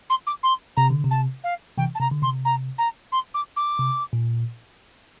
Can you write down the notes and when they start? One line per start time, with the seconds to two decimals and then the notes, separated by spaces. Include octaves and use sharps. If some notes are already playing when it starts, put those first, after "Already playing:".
0.10 C6
0.27 D6
0.43 C6
0.77 C3 A#5
0.90 D3
1.04 C3
1.11 A5
1.44 F5
1.78 C3 E3 G5
1.95 A5
2.00 C3 A#5
2.12 D3
2.22 C3 C6
2.45 A#5
2.78 A#5
3.12 C6
3.34 D6
3.57 D6
3.79 C3
4.13 A#2